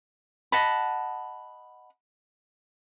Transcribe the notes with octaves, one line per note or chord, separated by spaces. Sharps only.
D#5 F#5 A5 B5